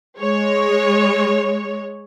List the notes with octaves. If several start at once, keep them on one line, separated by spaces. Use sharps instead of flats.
G#3 C#5